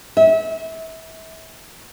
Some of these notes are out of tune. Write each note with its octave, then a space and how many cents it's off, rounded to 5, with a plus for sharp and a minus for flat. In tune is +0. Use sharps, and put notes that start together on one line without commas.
E5 -30